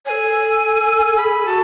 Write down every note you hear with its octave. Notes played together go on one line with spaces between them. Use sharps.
A4 C#5 G#5
G#4 B5
F#4 A5